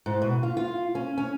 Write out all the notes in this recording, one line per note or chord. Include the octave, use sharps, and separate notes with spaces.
G#2
B2
F4
F4
C#4
C#4